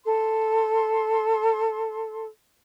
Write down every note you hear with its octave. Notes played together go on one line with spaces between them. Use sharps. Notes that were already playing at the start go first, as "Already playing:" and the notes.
A4 C6